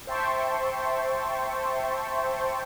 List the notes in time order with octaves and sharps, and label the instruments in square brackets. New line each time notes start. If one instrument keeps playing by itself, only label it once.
[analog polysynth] C5 E5 G5 A5 C6 C#6